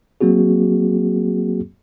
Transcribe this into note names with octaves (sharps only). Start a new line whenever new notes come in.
F#3 A#3 C4 F#4 G#4